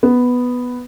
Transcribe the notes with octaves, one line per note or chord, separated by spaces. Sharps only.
B3